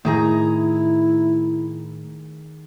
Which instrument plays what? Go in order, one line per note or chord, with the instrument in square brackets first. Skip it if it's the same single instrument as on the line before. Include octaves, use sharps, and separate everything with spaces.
[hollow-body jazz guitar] A2 [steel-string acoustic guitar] D#3 G#4 A#5 [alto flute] E4